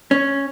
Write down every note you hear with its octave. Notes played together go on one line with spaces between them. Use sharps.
C#4